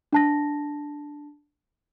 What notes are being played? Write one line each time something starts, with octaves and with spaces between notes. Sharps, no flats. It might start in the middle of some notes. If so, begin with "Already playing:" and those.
D4 A5 A#6